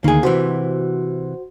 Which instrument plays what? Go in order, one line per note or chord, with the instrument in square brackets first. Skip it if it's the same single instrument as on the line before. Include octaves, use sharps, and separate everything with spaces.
[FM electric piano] D2 D#3 [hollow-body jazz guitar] A#3 G#4
[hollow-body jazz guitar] C3 E3 [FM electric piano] F#4 C5